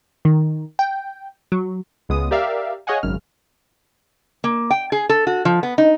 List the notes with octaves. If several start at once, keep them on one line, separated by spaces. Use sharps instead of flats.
D#3
G5
F#3
C#2 G#3 B3 D#6
G4 A#4 D5 E5 F5
G#4 C#5 D#5 F5 F#5 G#5
G#1 F#2 C#3 F6
A#3
G5
G#4
A4
F#4
F3
B3
D#4